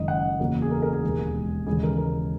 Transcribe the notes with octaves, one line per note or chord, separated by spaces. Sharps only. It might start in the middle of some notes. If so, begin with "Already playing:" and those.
Already playing: F#1 F#2 D#3 G#3 D#5
F#5
E2 C#3 F#3 A#3
G#4
A#4
A#4
G#4
E1 D#2 D#3 G#3
D#2 C#3 E3 G#3 G#4
A#4
A#4